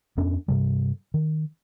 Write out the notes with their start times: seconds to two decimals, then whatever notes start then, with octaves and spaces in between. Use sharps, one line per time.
0.17 F2 B3 C#4 D4
0.48 G2 C3 G3
1.14 D#3